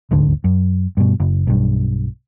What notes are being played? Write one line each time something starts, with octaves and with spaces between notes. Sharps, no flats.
D#1 G#1 D2 D3
F#2
G2 B2
F#1
B1 G2